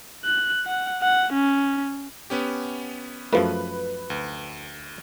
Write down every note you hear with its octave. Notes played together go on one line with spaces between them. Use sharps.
F#6
F#5
F#5
C#4
B3 C#4 G4
F#2 F3 A3 B4
D2